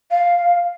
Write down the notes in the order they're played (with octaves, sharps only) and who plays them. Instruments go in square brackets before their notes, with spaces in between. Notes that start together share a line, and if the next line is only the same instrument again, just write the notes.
[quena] F5